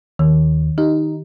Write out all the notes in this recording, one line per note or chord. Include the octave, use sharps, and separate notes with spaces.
D#2 D#3
D#4 G4